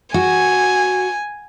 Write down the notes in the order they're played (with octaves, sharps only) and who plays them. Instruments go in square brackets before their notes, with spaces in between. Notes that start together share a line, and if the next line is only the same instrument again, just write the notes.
[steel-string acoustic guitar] F#4 [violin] G#5